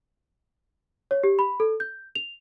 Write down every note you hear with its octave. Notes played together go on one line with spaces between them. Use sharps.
C#5
G4
B5
A4
G6
F7